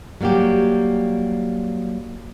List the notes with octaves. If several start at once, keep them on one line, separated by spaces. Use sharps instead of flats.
F#3 G3 A#3 F#4 G4